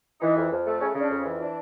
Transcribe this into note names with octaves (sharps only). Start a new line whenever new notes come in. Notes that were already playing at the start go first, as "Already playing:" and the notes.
E3 D#4
F2
F2
A3
C#3 C#4
C#3
D4
F2
E3
D4